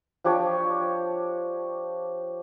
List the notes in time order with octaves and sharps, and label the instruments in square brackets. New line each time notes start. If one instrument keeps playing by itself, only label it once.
[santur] F3 D4 G4 C#5